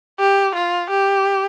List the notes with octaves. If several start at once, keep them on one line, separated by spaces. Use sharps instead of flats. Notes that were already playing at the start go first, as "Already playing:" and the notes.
G4
F4
G4